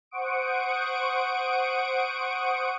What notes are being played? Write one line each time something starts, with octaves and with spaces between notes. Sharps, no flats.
C5 F#5 C#6 D#6 D7